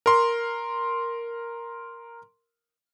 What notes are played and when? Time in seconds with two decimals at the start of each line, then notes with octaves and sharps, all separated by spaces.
0.06 A#4 C6